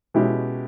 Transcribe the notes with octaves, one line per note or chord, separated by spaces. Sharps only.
B2 G#3 C#4 E4 G4